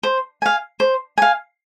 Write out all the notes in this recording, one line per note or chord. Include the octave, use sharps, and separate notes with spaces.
C5
F5 G#5
C5
F5 G#5